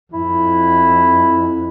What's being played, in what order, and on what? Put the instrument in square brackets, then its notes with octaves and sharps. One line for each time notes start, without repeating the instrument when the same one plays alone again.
[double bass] F2 [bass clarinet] E4